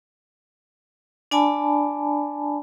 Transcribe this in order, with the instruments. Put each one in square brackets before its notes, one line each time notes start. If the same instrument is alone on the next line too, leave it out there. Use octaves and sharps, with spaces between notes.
[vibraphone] D4 D5 G#5 A5 B5